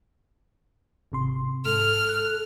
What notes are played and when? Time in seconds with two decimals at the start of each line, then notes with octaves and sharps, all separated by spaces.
1.12 G#1 C3 C6
1.65 G#2 A4 F6
2.09 F#6